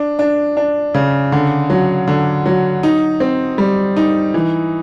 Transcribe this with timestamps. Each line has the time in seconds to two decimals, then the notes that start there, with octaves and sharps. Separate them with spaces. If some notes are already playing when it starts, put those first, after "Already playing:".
Already playing: D4
0.19 D4
0.57 D4
0.94 C#3
1.32 D3
1.70 F#3
2.08 D3
2.46 F#3
2.83 D#4
3.20 C4
3.58 G3
3.97 D#4
4.34 E3